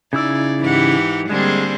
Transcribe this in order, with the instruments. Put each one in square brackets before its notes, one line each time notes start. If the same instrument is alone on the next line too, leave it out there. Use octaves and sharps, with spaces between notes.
[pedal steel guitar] C#3 E4 E6 [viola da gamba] D#4 D5
[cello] G#2 F#5 [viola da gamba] E3 D#4 G4
[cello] D3 A#3 [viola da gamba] G3 C4 G#4 [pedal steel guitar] G#3